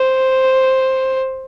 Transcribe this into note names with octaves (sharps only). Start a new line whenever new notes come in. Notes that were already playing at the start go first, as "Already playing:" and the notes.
Already playing: C5